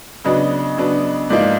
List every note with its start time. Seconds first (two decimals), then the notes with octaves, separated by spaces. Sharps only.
0.24 C#3 F#3 B3 D4 D#5
0.78 C#3 F#3 B3 D4
1.30 G#2 F3 A#3 D#4 D5